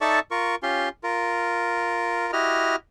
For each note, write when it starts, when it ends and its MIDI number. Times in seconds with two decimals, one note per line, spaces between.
0.01 0.19 63
0.01 0.19 69
0.01 0.19 74
0.01 0.19 76
0.01 0.19 81
0.01 0.19 85
0.31 0.55 65
0.31 0.55 70
0.31 0.55 85
0.63 0.89 61
0.63 0.89 65
0.63 0.89 67
0.63 0.89 84
1.04 2.31 65
1.04 2.31 70
2.33 2.76 64
2.33 2.76 66
2.33 2.76 67
2.33 2.76 75
2.33 2.76 89